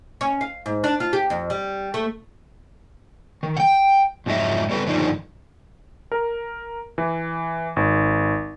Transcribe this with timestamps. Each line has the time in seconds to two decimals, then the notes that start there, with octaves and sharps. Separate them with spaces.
0.21 C#4
0.41 F5
0.66 G#2
0.84 D4
1.00 F4
1.13 G4
1.30 F2
1.50 G3
1.94 A3
3.43 D#3
3.57 F#5 G5
4.26 F2 G#2 F#3 B3 D#5 E5
4.69 G3 A4 B4
4.86 G2 D3 D#3 F3 D4 D#4
6.12 A#4
6.98 E3
7.76 G#1